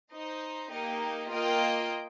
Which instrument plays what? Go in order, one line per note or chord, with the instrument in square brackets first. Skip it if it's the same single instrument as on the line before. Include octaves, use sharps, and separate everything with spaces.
[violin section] D#4 C5 D#5
A#3 D#4 G4 D#5
A#3 F4 D#5 G5